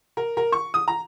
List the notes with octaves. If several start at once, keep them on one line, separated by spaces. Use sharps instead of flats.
A#4
A#4
C#6
D#6
A#5